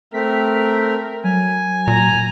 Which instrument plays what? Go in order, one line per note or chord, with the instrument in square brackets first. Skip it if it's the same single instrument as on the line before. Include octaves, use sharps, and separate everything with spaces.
[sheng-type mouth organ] A3 C4 [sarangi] A#4 [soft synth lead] B6
[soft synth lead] F#3 [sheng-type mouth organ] G#5
[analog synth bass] A#2 [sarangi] A#5